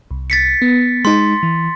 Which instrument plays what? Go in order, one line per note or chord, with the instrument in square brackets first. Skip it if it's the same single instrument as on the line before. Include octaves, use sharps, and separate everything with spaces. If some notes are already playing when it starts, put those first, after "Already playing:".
[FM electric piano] C2
[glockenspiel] A6 B6 C#7
[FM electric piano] B3
[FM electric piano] G#3 D#4 [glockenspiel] C6
[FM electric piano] E3